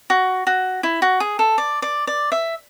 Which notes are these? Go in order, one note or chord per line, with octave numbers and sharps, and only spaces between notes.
F#4
F#4
E4
F#4
G#4
A4
D5
D5
D5
E5